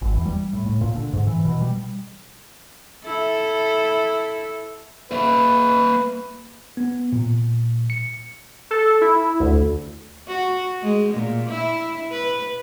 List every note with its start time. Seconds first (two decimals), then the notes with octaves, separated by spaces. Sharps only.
0.02 G#1
0.14 E2
0.26 G3
0.53 A2
0.66 A2
0.81 A#2
0.96 D3
1.13 G#2
1.27 E3
1.45 B2
1.61 G3
3.04 E4 A4
5.12 A#3 B4 E5
6.77 B3
7.12 A#2
7.90 C#7
8.71 A4
9.01 E4
9.40 D2
10.28 F#4
10.82 G#3
11.14 A#2
11.49 E4
12.11 B4